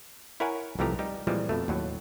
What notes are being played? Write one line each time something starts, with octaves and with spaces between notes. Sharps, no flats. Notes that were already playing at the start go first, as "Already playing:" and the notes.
E4 A#4 C#5 F#5 G#5
C2 E3 F3 A3 G4 A#5
G3 D#4 G4
A#2 E3 F3 G3 G#3 C4
F2 B2 A3
D#2 A2 F#3